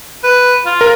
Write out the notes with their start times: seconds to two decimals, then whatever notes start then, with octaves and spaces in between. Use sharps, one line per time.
0.23 B4
0.65 F4
0.81 A#4